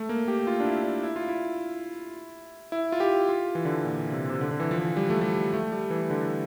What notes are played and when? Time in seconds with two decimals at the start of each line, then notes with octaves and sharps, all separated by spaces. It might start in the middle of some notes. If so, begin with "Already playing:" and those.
Already playing: A3
0.09 A#3
0.28 G4
0.47 F4
0.60 D4
0.65 E4
0.84 D4
1.03 E4
1.16 F4
1.29 E4
2.72 E4
2.92 F4
3.00 G4
3.29 F4
3.55 E3
3.65 D3
3.84 A#2
4.12 C3
4.29 C3
4.41 D3
4.51 D3
4.60 E3
4.71 F3
4.78 E3
4.97 G3
5.10 A3
5.21 G3
5.54 A3
5.72 G3
5.90 E3
6.10 D3